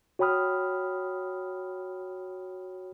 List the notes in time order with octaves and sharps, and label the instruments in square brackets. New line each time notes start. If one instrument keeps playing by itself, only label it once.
[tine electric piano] F#4 C#5 G5 B5 D#6 F6